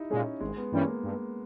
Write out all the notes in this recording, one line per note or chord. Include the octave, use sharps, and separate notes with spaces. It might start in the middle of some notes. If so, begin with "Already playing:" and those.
Already playing: D#4 E4 G4
A#2 G#3 C#4
G#1 G#3
B3
G2 E3 G3 A#3 C#4
A#3
G2